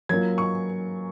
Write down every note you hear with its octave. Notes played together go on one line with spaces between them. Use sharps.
F#3 A#3 C#4 F4 G#6
C#6